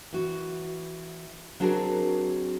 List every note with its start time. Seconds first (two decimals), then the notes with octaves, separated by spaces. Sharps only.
0.13 E3 F#4
1.60 F#3 C4 D4 F#4 G#4 A#4